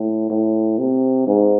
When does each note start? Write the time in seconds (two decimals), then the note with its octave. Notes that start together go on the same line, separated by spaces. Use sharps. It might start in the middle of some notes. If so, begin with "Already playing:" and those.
Already playing: A2
0.29 A2
0.78 C3
1.27 G#2